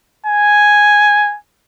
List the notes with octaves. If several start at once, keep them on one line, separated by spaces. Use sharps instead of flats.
G#5